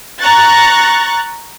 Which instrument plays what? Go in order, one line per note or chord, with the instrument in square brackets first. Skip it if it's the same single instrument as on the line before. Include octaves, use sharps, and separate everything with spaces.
[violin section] A#5 C#6 F#6 A6